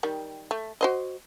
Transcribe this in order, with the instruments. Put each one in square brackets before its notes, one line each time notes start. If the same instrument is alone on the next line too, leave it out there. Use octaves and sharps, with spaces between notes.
[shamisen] D#3 G3
A3
F#4 C5 D#5